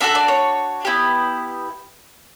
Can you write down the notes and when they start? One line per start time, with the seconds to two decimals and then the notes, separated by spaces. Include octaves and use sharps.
0.01 D4 F#4 A4 E5
0.15 D5
0.28 C#5
0.85 B3 E4 G4